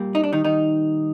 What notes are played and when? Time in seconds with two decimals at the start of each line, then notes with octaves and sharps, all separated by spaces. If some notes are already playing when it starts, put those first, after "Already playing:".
Already playing: A#2 G3 A#3
0.15 D#4
0.24 D4
0.33 D#3 D#4
0.44 D#3 D#4